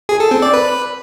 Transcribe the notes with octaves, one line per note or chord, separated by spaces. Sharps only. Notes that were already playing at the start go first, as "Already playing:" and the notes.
G#4
A4
C4
D5
B4